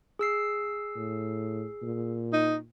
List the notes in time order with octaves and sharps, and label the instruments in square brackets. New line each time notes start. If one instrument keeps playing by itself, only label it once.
[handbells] G#4 E6 C7
[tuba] A2
A#2
[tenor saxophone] D#4